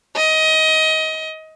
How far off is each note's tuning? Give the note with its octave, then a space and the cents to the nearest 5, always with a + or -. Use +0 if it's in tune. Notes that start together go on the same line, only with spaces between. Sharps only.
D#5 +20